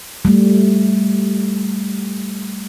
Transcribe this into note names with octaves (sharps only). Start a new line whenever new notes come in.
G3 A3